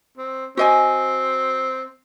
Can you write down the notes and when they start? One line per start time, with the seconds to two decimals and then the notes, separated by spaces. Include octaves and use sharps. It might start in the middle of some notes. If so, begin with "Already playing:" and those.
0.17 C4
0.57 C4 F#4 D#5 G#5